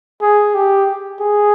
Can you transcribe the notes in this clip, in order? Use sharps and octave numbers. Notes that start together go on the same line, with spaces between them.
G#4
G4
G#4